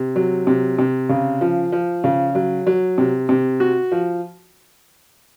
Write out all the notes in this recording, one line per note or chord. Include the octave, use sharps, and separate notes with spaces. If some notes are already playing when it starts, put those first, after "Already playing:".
Already playing: C3
F#3
C3
C3
C#3
F3
F3
C#3
F#3
F#3
C3
C3
F#4
F3